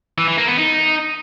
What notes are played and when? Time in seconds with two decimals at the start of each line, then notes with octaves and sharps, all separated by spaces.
0.18 E3
0.28 E3
0.38 A#3
0.48 B3
0.58 D#4